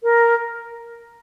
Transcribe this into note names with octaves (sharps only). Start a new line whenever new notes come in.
A#4